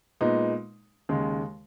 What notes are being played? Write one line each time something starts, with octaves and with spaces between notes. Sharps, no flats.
A#2 G#3 B3 D#4
D#2 C#3 G#3